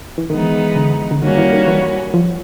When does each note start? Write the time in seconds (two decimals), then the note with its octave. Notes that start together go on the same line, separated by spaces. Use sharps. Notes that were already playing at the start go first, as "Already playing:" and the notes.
0.18 E3
0.30 D#3 E3 G#3 B3 D#4
0.76 D3
1.11 D3
1.22 D#3 G3 A#3 C#4 F#4
1.37 E3
1.53 D#3
1.67 E3
2.14 F3